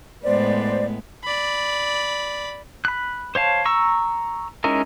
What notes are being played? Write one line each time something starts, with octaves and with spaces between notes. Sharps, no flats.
A2 G#3 B3 C5 D5
D5 B5
B5 F#6
C5 C#5 F5 A5
A#5 C#6 E6
G#3 C#4 D#4 E4 A#4